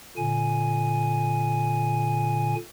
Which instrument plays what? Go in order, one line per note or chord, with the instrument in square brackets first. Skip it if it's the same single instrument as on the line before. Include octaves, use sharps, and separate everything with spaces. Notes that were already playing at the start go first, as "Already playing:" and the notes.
[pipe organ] A#2 D3 G#5